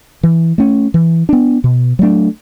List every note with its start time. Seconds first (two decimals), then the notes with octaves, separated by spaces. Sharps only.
0.23 E3
0.58 A3 C#4
0.94 E3
1.29 B3 D4
1.64 B2
1.99 F#3 A3 D4